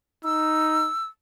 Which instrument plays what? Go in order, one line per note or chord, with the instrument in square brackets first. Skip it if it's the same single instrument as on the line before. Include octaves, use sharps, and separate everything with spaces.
[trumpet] D#4 [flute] E6